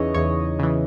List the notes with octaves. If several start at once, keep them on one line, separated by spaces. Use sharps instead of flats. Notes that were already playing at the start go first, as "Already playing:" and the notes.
Already playing: E2 C#3 E3 D#4 C#5 D#5
E2 C#5
C#3 E3